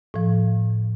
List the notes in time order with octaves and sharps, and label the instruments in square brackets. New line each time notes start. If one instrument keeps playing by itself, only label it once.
[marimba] A2 F3